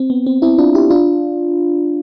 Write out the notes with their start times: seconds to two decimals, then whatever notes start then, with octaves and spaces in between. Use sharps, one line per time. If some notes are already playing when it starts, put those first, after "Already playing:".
Already playing: C4
0.10 B3
0.26 C4
0.42 C4 E4
0.58 D4 F4
0.75 E4 G4
0.90 D4 F4